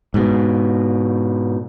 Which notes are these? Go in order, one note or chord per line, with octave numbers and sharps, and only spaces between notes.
G#2 B2